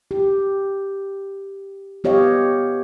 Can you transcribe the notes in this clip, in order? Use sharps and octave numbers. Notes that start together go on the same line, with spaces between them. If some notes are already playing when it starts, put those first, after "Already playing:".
G4
B3 G4 C#5 D#5 F5